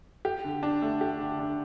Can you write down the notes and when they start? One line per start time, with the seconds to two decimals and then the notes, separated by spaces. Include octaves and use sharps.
0.25 G4
0.44 D3
0.63 D4
0.82 A3
1.01 G4
1.20 D3
1.39 D4